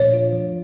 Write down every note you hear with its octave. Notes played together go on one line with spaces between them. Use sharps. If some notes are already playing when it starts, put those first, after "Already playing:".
Already playing: A#2 F3 A3 D4 C#5
F4
F3